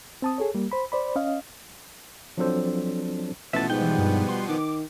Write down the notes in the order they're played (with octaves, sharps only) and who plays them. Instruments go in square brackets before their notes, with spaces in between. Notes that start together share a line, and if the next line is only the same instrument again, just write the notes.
[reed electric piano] C4 A5 D#6
G#4 A4 C#5
G3 A#3
C5 B5
C5 D5 B5
C#4 D#5 F5
[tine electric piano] F3 F#3 C4 D4 A4 C5
[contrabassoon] A1 [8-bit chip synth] B2 F3 B3 [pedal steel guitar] E5 A5
[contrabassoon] G#2 [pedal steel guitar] G3 G5
[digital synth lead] E3
G2
C6
[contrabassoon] D#3 [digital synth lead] D6